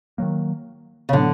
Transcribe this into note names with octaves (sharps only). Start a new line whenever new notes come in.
D#3 F#3 A#3
C#3
A2 D3 F#3 B3